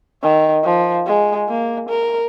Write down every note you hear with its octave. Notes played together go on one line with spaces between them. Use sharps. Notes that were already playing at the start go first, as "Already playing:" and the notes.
D#3
F3
G#3
A#3
A#4